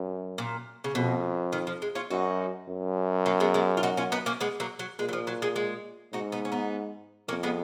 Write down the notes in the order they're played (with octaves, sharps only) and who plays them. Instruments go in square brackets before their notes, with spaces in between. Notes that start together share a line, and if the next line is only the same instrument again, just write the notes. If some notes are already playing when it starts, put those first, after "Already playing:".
Already playing: [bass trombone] F#2
[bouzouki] A#2
C#3
[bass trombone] F2 [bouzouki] B2
[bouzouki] D#3
F3
G#3
C#4 F4
[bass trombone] F#2 [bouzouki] D#4 F#4
[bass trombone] F#2
[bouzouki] F#3 A#3
G#3 B3
G#3 B3
F4
D#4 F#4
C#4 F4
B3 D#4
A#3 C#4
G#3 B3
F#3 A#3
F#3
[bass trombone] A#2 [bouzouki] G#3
[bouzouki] F#3
F3
F#3
G#3
G#3
[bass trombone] G#2 [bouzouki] D#4 F#4
[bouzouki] B3 D#4
C#4
B3 D#4
[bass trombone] F2 [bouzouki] A#3 C#4
[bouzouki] G#3 B3